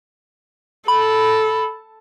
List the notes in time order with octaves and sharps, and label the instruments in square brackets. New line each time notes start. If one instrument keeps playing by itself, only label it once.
[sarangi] A4 [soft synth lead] B5